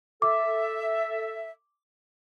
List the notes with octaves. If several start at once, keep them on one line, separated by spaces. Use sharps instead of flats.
A4 E5 D6